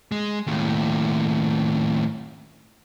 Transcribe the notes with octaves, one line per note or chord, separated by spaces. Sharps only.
G#3
D#2 A2